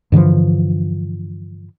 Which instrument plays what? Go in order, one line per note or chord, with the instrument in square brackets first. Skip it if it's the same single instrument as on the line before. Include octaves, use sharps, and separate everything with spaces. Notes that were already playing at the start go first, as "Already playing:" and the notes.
[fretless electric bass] G2 D3 E3 F3